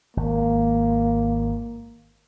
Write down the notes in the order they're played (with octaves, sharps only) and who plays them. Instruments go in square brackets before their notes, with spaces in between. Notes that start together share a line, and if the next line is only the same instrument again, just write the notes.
[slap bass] G#1 [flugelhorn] A#3